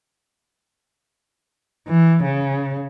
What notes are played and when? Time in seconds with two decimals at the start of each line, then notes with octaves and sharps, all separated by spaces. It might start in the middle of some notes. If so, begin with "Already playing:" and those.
1.88 E3
2.24 C#3